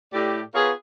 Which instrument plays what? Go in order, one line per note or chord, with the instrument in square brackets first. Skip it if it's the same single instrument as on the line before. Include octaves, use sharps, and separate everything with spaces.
[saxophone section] A2 G4 D5
B3 F4 G#4 A#4 B4 C#5